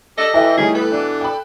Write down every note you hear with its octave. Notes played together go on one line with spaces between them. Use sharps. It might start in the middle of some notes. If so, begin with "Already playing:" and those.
D4 G4 A4 D#5
E3 A4 E5 G5
E3 G3 A3 C#4 D#4 G#4
B2 B3 A4 B4
B2 E3 D4 F#6
G5 B5